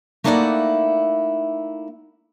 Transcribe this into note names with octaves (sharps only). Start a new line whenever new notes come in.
A3 A#3 D#4 E4 D5 F#5